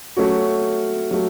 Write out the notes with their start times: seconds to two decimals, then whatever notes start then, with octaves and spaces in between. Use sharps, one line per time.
0.17 F#3 A3 C#4 F#4
1.11 F#3 A3